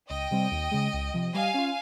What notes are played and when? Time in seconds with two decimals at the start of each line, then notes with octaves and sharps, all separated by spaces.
0.10 C#2 D#5 G5
0.31 C3 G3 C4
0.51 D#2
0.71 C#3 G#3
0.93 C#2
1.14 C3 F3
1.34 G3 F5 G#5
1.54 C#4 F4